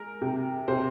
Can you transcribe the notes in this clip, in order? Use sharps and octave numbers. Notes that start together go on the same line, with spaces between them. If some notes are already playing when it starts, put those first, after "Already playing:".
Already playing: G#3 A#4
C3
C3 C5